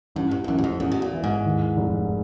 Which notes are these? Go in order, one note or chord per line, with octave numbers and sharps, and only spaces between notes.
A1 G2
G2
G2
A1 F#2
E2
F2
A1 E2
B2
A#2
E3
G#2
D#2
F1